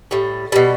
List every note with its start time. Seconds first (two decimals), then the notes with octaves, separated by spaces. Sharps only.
0.11 A2 G3
0.52 B2 G3